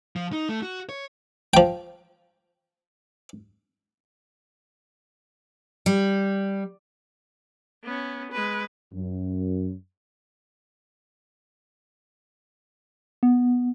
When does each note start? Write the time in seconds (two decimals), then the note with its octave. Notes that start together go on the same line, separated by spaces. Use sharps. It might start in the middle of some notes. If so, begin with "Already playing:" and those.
0.16 F3
0.33 D#4
0.49 A3
0.63 F#4
0.89 C#5
1.54 F3 G5
5.86 G3
7.84 B3 C#4
8.32 G#3 B4
8.93 F#2
13.23 B3